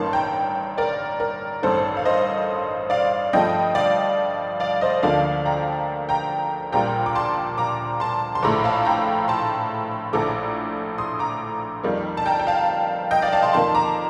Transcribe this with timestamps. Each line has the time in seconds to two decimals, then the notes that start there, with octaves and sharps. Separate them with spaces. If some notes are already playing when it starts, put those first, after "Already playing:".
Already playing: A1 G2 D#3 A#3 A5 C6
0.13 G5 A#5
0.78 A#4 D5
1.20 A#4
1.63 A1 G2 D#3 A4 C5
1.97 F5
2.05 C5 D#5
2.90 D5 F5
3.33 G2 F3 A3 D#5 G5
3.75 D5 F5
4.60 D5 F5
4.81 C5 D#5
5.03 D2 D3 F3 A#3 D5 F5
5.46 G5 A#5
6.09 G5 A#5
6.72 A#1 A#2 G3 A#3 G5 A#5
7.06 D6
7.15 A5 C6
7.58 A#5 D6
8.00 A5 C6
8.35 C6
8.43 A#1 A2 A3 A#5 D6
8.64 F5 A5
8.85 G5 A#5
9.28 A5 C6
10.13 A#1 A2 A3 A#5 D6
10.98 C6 D#6
11.19 A#5 D6
11.83 F2 D#3 G3 A#3
12.17 A5
12.26 G5 A#5
12.39 G5
12.47 F5 A5
13.11 D#5 G5
13.22 D5 F5
13.32 F5 A5
13.43 A5 C6
13.53 F2 D#3 A#3 A5 C6
13.75 A#5 D6